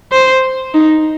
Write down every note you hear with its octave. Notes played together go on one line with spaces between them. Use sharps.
C5
D#4